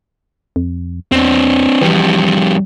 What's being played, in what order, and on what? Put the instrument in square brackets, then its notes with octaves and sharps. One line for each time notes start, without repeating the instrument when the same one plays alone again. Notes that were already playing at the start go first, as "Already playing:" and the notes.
[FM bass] F2
[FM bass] E2 [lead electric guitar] C4 D4
[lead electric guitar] F2 G3 [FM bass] E3